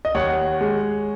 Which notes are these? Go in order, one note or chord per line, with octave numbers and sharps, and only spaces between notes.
D#5
D#2 C#5 F#5
G#3